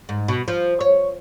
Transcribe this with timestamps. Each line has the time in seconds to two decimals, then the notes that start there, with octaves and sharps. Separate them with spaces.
0.09 G#2
0.28 B2
0.48 F3
0.81 C#5